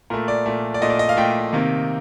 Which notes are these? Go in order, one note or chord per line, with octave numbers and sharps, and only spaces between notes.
A#2 A3 A#4
D5
A#2 A3
D5
A#2 A3 D#5
D5
D#5
F5
A#2 A3 G5
C3 D#3 A#3